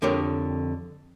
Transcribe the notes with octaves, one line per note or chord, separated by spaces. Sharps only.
F2 D3 G4 A#4 C#5